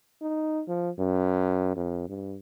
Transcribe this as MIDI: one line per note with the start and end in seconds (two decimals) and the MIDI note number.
0.22 0.63 63
0.68 0.90 53
0.99 1.71 42
1.76 2.04 41
2.09 2.38 43